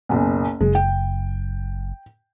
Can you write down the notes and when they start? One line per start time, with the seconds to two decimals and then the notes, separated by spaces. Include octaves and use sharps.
0.09 F#1 B1
0.61 F#1 G#3
0.75 G5